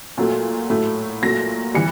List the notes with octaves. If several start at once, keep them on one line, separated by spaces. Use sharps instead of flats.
A#2 F#3 A3
A2 F#3 A3
A#2 F#3 A3 A#6
E3 G3 C#7